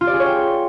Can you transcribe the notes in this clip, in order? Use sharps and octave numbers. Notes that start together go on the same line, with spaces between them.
F4
D5
G#4
C#5
G5